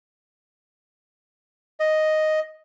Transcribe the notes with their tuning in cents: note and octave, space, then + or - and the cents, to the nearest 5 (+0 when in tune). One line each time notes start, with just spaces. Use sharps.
D#5 +0